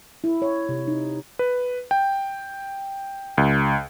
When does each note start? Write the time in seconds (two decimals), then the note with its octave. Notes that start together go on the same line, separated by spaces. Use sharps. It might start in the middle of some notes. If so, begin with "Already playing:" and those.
0.24 E4
0.42 C#5
0.69 C3
0.88 D#4
1.39 B4
1.91 G5
3.38 C#2